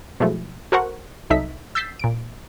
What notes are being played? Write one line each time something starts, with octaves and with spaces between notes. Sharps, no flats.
B2 F3 F#3 G#3 A3 E4
F#4 A4 A#4 C5 F#5 C#6
C2 F#3 D#4 A4 E5 B6
E6 G6 A6 B6 C7
A#2 D7